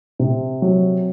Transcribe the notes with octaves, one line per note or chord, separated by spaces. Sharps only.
C3
F#3